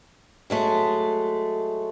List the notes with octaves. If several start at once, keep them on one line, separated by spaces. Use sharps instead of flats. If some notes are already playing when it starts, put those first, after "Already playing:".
F#3 G#3 A3